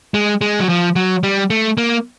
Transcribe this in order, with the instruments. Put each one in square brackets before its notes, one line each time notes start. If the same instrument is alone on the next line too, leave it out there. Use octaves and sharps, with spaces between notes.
[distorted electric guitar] G#3
G#3
F#3
F3
F#3
G3
A3
A#3